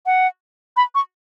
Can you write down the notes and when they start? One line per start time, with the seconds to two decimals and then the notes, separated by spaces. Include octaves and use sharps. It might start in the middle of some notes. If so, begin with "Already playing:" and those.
0.06 F#5
0.77 B5
0.95 C#6